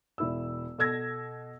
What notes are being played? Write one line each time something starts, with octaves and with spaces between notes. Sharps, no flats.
E1 E4 E6
B2 A4 E6 G#6 A#6